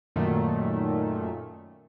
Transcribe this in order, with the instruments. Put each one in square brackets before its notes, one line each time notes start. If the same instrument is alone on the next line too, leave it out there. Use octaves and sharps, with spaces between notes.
[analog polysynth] F#2 A#2 D#3 A3